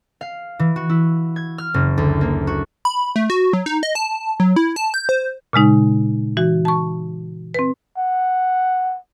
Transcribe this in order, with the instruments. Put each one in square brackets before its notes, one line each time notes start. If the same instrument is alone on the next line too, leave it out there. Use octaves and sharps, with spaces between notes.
[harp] F5
E3
F#4
E4
G#6
F6
F#1
D2
A#3
F#4
[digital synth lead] B5
A3
F#4
F#3
D#4
D#5
A5
F#3
E4
A5
G6
C5
[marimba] A#2 C#3 G#3 D#4
E3 F#4
A5 C#6
C4 B4
[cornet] F#5